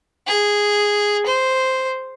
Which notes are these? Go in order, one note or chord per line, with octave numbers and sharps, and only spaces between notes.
G#4
C5